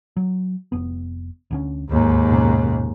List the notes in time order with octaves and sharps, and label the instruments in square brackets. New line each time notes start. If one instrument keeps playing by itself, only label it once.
[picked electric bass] F#3
F1 B3
D2 D3 C#4
[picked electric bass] D1 [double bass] D#2 G#2
[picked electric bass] F#1 B2 C#4